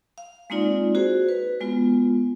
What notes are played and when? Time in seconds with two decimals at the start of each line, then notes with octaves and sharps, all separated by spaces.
0.18 F5
0.50 G#3 A#3 C4 D#4 F4 D5
0.95 F#4 G#4 C5
1.29 B4
1.60 G#3 B3 F4